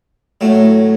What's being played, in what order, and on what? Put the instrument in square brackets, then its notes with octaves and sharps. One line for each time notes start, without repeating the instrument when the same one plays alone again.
[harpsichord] A2 F#3 A3